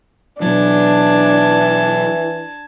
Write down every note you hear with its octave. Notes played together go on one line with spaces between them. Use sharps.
B2 E3 F#3 D4 A5 G#6